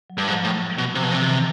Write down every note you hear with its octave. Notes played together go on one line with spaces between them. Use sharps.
F#3
G2
G#2 F3
A2 F#3
B2
C3 F3
B2
C3 E3
D#3
E3